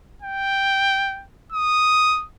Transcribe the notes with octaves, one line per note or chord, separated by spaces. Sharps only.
G5
D#6